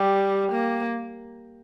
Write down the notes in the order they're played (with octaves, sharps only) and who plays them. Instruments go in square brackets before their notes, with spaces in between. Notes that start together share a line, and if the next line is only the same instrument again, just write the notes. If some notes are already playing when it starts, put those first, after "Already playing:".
Already playing: [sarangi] G3 [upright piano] G4
[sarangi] A#3